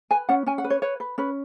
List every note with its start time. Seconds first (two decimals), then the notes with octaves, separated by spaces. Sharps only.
0.11 B4 G#5
0.29 C#4 F#5
0.46 C#4 G#5
0.58 F#5
0.64 B4
0.70 C#5
0.82 B4 C#5
1.00 B4
1.18 C#4 B4